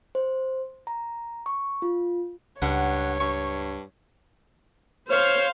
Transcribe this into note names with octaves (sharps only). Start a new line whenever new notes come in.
C5
A#5
C#6
F4
C#2 G2 C#5 F#5
G2 C#6
C5 C#5 F5